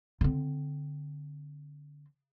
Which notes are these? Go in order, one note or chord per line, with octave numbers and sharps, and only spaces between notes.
D3 C4